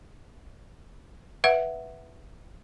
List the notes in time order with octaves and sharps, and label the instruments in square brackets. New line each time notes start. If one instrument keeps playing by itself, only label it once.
[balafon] B4 E5 F#5